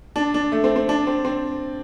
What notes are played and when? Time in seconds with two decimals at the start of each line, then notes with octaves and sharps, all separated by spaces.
0.16 D4
0.34 D4
0.52 A3
0.64 C4
0.76 C4
0.89 D4
1.07 C4
1.25 C4